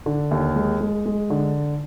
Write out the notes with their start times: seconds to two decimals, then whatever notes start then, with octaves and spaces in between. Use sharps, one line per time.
0.06 D3
0.31 D#2
0.56 G#3
0.81 G#3
1.06 G#3
1.30 D3